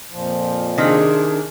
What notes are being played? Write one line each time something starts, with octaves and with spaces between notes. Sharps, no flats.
F2 A#2 F3
C3 D#3 D4 G#4